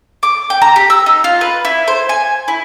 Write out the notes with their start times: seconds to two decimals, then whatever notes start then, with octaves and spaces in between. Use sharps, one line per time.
0.23 D6
0.50 G5
0.62 A#5
0.76 G4
0.90 E6
1.06 D#4
1.24 F4
1.41 B4
1.65 E4
1.88 C5
2.09 G#5
2.48 E4